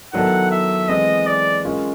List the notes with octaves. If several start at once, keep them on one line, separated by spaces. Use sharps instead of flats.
D#3 F#3 B3 E4 A4 F#5
E5
E3 G#3 C4 D#5
D5
G#3 C#4 F4 A#4